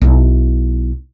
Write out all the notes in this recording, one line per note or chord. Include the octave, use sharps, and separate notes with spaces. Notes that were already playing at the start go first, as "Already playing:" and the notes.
B1 E4